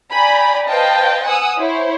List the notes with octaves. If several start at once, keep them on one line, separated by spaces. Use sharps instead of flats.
D5 G5 G#5 A#5 B5
B4 C5 D#5 F5 G5 A5
F#5 G#5 D#6 E6
E4 C5 C#5